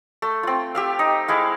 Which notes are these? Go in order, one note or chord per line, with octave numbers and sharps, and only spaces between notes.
A3
C4 F4
G4 E5 F5
D#4
G#3 E4 F5